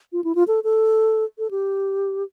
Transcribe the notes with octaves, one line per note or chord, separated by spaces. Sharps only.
F4
E4
F4
A4
A4
A4
G4